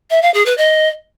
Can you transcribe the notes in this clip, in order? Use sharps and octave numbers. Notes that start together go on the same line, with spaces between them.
E5
F5
G#4
B4
D#5